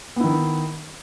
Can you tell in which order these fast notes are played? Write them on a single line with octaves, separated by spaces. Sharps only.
B3 E4 D#3